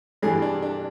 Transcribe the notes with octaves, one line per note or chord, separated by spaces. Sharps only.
G2 E3 G3 G#4
D4
D4